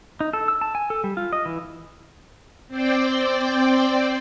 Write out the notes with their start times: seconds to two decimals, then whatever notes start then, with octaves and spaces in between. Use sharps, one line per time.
0.20 D#4
0.33 A4
0.48 E6
0.61 A5
0.75 G#5
0.90 A4
1.04 G3
1.17 F4
1.33 D#5
1.46 E3
2.67 C4 C5 D5 G5